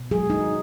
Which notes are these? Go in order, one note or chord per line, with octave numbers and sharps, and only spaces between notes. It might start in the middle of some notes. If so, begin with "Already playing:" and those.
Already playing: B2
F#3 G#4
D#4